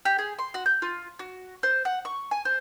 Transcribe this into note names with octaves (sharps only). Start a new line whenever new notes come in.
G4
G#4
C6
F#4
G6
F4
F#4
C5
F#5
C#6
G#5
C5